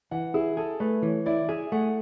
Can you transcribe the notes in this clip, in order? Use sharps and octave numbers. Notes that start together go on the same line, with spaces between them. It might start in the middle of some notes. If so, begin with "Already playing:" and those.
E3 F#5
E4 G#4
G#4 A4
A3 B4
E3 C#5
E4 D5
G#4 E5
A3 F#5